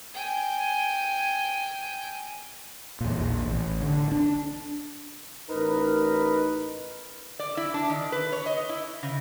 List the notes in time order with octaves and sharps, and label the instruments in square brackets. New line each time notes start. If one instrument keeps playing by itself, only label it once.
[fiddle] G5 G#5
[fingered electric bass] E2 A#2
A#1
A1
D3
D4
[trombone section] A1 D#4 A#4 B4
[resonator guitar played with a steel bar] D5
E4
D4
D#3
B4
C#5
D#5
E4
C#3